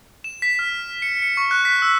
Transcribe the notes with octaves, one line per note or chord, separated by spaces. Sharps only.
E7
B6
F6
C#7
C#7
C#6
F#6
B6
E6